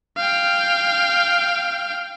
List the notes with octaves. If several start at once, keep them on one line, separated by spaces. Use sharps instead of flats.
F5 G5